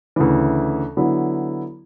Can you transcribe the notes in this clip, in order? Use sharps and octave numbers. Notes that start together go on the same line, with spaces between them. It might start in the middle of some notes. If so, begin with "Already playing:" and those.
D2 C#3 E3
D3 F#3 B3 E4